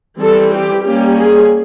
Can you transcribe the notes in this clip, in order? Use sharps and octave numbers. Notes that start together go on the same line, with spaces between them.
E3 G3 C4 A4
G4
G3 A#3 C#4 G4
G#4